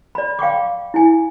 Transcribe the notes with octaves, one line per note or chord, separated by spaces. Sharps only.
D5 B5
F5 G5 C#6 D6
E4 G#5